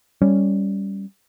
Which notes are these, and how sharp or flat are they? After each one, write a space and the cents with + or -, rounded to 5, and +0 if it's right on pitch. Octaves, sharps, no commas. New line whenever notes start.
G3 +5 C#4 +0